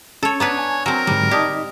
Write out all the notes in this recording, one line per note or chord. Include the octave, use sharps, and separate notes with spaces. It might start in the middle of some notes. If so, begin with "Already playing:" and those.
C#4 A4 C#5 A5
B3 D4 B4 C#5 A#5
G#5 A5
F#3 C4 A#4
G#2 D3 F#3 G3
D#4 G4 D5 D#5 A5 D#6